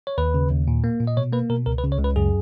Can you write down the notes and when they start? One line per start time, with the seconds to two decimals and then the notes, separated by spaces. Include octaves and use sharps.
0.07 C#5
0.18 D#2 B4
0.34 C#3
0.51 D#2
0.68 A#2
0.84 A#3
1.00 A#2
1.07 D#5
1.17 B2 C#5
1.33 A#3 B4
1.50 B2 A#4
1.66 C#2 A#4
1.78 B4
1.84 C#3
1.92 C#5
1.99 C#2
2.04 B4
2.16 F#2 G#4